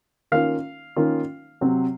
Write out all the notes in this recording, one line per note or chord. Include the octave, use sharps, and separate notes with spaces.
D#3 A#3 C#4 F4 F5
D#3 A#3 C#4 F4
C3 F#3 C4